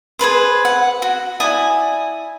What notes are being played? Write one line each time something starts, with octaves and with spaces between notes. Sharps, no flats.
G#4 A4 B4 C5
F#5
F#4
E4 D5 G#5 D#6